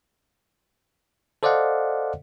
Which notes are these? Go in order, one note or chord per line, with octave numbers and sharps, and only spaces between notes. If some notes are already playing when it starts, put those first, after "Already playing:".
A4 C5 D5 D#5 F5 F#5